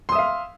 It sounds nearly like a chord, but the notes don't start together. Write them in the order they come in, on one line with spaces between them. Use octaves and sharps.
C6 D#6 E5 F5